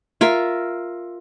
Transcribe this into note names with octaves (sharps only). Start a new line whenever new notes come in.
F4 A#4 E5